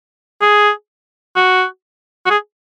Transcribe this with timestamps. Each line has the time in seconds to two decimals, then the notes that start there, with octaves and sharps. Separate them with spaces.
0.42 G#4
1.36 F#4
2.26 F#4
2.30 G#4